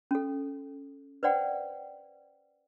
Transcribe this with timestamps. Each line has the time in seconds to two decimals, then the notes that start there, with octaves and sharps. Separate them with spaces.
0.11 C#4 A4
1.23 B4 C5 D5 F#5 G5